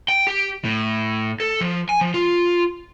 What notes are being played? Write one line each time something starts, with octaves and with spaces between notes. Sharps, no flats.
G5
G4
A2
A4
F3
G#5
F3
F4